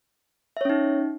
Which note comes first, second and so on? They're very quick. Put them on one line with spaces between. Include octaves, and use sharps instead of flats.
E5 C#5 C#4 D#4